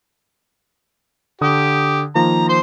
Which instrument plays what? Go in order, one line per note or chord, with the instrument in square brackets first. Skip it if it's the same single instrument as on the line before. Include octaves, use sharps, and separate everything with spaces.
[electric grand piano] D3 D#6 [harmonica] G4
[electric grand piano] D#3 F3 A#3 [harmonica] A#5
[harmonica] C5 C6